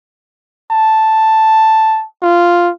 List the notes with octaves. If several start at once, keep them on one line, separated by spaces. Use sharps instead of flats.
A5
F4